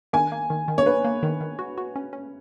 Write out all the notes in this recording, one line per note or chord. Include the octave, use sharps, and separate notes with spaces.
D#3 G#5
A#3
D#3
D#3
C#5
A#3 B4
A#3
D#3
D#3
F#4
F#4
C#4
C#4